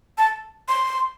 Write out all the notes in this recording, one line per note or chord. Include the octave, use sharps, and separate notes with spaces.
A5
C6